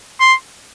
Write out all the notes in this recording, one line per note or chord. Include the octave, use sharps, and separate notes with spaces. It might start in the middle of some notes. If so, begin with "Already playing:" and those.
C6